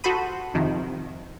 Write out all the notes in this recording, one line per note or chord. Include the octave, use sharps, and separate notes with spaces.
F#4 A4 C5 B5 D#6
F2 C3 D#3 F3